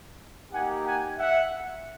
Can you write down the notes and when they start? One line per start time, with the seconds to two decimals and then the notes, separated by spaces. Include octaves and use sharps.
0.52 A#3 D#4 G4 F#5 G#5
0.86 F#5 G#5
1.18 E5 F#5